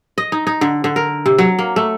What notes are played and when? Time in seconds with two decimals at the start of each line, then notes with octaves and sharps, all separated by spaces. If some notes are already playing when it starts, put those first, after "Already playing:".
0.18 D#5
0.32 D#4
0.47 D#4
0.61 D3
0.84 D3
0.96 A#4
1.26 C3
1.38 F#3
1.59 A#3
1.76 A3